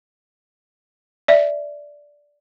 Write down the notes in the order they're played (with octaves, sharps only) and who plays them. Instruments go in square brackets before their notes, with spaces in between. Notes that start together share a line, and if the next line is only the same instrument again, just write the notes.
[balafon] D5 E5